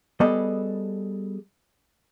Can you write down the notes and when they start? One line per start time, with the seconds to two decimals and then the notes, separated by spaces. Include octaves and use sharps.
0.20 G3 B3 G#4 A4 D#5